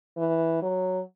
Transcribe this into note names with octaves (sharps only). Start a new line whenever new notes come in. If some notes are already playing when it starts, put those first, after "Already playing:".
E3
F#3